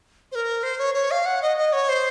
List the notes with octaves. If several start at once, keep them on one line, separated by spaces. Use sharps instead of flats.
C5
A#4
C5
C#5
C#5
F5
F#5
D#5
D#5
C#5
C5